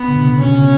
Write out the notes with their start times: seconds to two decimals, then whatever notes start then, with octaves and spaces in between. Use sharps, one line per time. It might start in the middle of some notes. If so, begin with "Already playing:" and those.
Already playing: B3
0.08 D3
0.16 B2
0.24 C#3
0.40 B2 C#4
0.56 C#3